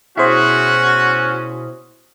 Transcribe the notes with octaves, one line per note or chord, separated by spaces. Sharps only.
B2 C#4 E4 F#4 G#4 C5 E5